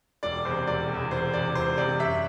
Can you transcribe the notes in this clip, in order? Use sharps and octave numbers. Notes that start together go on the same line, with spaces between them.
E1 D5
E2 C3 C5
E1 D5
E2 C3
E1 C5
E2 C3 D5
E1 C5
E2 C3 D5
F#2 E5